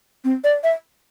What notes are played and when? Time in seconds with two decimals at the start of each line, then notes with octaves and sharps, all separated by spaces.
0.24 C4
0.44 D5
0.64 E5